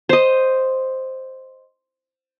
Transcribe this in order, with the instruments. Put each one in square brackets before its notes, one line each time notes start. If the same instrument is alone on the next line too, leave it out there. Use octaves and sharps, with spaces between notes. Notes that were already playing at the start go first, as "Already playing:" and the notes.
[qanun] C5 D#5